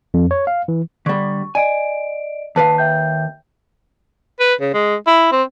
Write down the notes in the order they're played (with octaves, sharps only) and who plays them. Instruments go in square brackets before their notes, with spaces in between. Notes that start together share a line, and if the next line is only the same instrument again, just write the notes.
[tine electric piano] F2
C#5
F5
E3
[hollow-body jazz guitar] D3 G3 [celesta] C#6
[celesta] D5 D#5 D7 [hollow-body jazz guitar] G#5
[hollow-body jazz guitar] D#2 B4 F5 [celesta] A5
[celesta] E5 G5 G6
[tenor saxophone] B4
C#3
G#3
E4
C4